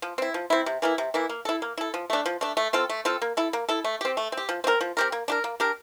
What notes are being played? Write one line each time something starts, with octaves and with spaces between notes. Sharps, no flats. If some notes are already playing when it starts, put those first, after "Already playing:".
F3
C4 E4
F3
C4 E4
C3
E3 A#3 E4
C3
E3 A#3 E4
A#3
E4 A4
A#3
E4 A4
F3
A3 D4
F3
A3 D4
A3
C4 F4 A4
A3
C4 F4 A4
A#3
E4 A4
A#3
E4 A4
A3
C4 G4
A3
C4
G4
F3
C4 G4 A#4
F3
C4 G4 A#4
A#3
D4 G4 A#4
A#3
D4 G4 A#4